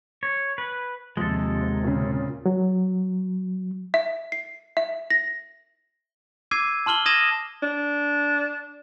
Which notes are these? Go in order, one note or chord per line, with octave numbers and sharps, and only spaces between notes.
C#5
B4
D#2 C3 F3 G#3 A4
A#2 C#3
F#3
E5
C7
E5
A#6
D6 E6 G#6 C7 D#7
A5 C6 F6 F#7 G7
D#6 G#6 A#6 D#7 E7
D4